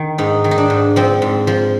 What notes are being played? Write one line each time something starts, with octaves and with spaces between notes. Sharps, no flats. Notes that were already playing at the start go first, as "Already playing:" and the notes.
Already playing: D#3
G#2 D#4
D#3
D#4
D4
G#2
F3 C4
G#2
F3